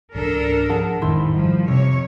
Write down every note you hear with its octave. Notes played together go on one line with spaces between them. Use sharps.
C#2 G#2 E3 D4 A4 A#4
F3 G#4 F#5 A5
A1 F2 G#2 D#3 E4 C6
F3 G3
F2 C3 C#5